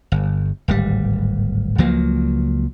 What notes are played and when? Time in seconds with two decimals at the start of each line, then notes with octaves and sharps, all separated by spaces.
0.12 G1
0.68 D1 G#1 G3
1.78 C#2 F3 F#3 A#3